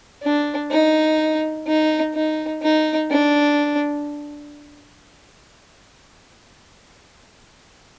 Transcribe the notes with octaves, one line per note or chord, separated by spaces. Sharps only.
D4
D#4
D#4
D#4
D#4
D4